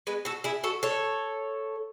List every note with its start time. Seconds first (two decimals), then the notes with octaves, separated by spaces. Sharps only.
0.07 G#3 B3
0.25 F#4 A4
0.44 E4 G#4
0.64 F#4 A4
0.83 A4 C#5